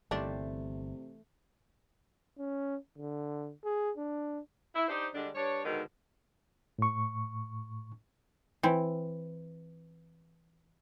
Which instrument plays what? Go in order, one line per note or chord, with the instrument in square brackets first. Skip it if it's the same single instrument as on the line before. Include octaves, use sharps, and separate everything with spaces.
[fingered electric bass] G1 [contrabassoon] C3 [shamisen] D#3 G3 D4 [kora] E3 A3 C5
[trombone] C#4
D3
G#4
D4
[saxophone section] E4
D4 D#4 G4 C5
D3 G3 G#3 D4
G2 D4 C#5
G#2 B2 D3 D#3
[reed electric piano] A2 C#6
[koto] E3 C4